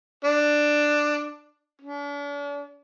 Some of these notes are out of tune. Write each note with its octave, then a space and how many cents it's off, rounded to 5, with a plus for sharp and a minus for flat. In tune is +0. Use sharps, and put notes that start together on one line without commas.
D4 +10
D4 -45